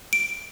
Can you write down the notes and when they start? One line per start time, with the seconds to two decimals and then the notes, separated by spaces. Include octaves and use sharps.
0.13 D7